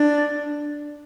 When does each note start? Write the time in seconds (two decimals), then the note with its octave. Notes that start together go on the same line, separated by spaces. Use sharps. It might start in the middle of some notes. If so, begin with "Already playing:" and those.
Already playing: D4